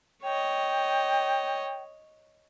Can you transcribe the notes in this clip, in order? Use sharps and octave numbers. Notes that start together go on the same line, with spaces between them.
C#5 D#5 G5